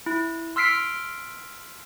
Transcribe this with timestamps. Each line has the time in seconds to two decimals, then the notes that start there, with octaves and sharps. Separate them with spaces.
0.06 E4
0.56 C6 E6 F6 B6 C7 D7